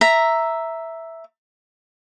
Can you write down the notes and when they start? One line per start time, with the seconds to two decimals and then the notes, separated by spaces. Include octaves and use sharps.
0.01 E5 A#5